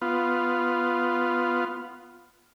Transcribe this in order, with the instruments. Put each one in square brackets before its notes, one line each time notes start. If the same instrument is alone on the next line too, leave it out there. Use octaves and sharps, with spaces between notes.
[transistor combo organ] B3 F4